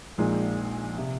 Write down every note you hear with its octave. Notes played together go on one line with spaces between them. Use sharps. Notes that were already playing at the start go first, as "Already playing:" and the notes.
A#1 A#2 G#3 D#4
C3